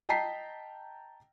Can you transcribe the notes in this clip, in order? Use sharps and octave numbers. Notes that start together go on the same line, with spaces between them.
D#5 G5 A5 A#5 B6 C7